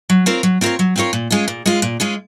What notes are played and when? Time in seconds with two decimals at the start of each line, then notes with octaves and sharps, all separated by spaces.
0.10 F#3
0.26 C4 F4 A#4 C#5
0.43 F#3
0.61 C4 F4 A#4 C#5
0.79 F#3
0.96 C4 F4 A#4 C#5
1.13 A#2
1.30 G#3 C#4 F4
1.48 A#2
1.66 G#3 C#4 F4
1.82 A#2
2.00 G#3 C#4 F4